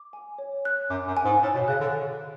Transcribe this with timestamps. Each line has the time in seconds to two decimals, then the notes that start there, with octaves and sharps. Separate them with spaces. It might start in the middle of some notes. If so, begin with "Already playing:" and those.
Already playing: D6
0.13 G#5
0.38 C#5
0.65 F#6
0.90 F#2 D6
1.07 F#2
1.17 G#5
1.25 G#2
1.42 A2 C#5
1.55 B2
1.68 C#3 F#6
1.80 D3